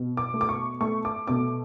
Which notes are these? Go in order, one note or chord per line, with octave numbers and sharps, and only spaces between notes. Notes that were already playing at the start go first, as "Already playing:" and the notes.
Already playing: B2
D6
A3
D6
C#6
A3 C#6
D6
B2 D6